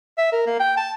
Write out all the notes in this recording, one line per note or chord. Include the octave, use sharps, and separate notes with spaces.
E5
A#4
A#3
G5
A5